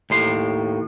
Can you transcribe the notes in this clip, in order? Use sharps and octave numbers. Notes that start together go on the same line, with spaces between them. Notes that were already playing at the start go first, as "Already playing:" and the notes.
D#2 A2 C6